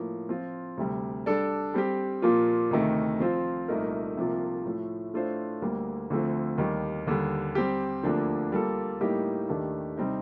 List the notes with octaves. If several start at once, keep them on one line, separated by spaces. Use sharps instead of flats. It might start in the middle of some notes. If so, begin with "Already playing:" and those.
Already playing: A2 F3 A#3
F3 C4 F4
D2 C3 G3
G3 D4 A4 D5
G3 C4 G4
A#2 F3 A#3 F4
D2 C3 D#3 A3
F3 C4 F4 C5
C2 A#2 A3 D#4 A#4
C2 C3 F3 A#3 F4
A2 F3 A3
A2 A3 D4 F4 C5
D2 D3 G3 A#3
D2 D3 F3 A3 C4
D#2 D#3 G3
D#2 D3 G3
G3 C4 G4
D2 D3 F3 A#3 D4
G3 A#3 F4 A4
A2 G3 A#3 D#4 G4
D#2 D#3 A3 D4 G4
C3 G3 C4 D#4